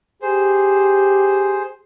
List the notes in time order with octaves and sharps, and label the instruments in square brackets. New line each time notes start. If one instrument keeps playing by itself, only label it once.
[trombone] G4 [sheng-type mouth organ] G#4 C5